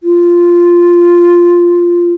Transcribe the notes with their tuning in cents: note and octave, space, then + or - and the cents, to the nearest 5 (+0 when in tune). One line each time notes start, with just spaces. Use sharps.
F4 -5